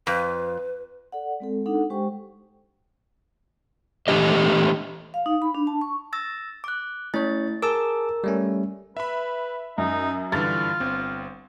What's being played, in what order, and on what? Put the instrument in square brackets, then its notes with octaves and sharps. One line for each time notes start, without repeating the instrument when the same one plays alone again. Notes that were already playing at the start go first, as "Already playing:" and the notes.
[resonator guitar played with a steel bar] F2 [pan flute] B4
[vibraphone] A4 D5 F#5
G#3 C4 A4
D4 D#4 A4 F#5
G#3 G4 C5 G5 C#6
[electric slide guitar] E3 A3 D4 G4 D#5
[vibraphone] F5
D#4
B5
D4
A5
C#6
[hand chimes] E6 A6 A#6
D6 F#6
[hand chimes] A3 E4 A6 [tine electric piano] C#4 C#5
[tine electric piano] G#4 A5 D6 [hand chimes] A#4 E6
[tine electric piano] G3 A3 C#4
[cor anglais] B4 [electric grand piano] E5 B5
[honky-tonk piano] F#2 [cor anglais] D#4
[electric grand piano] G2 D3 E3 [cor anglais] F4 [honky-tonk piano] A6
[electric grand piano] G1 C4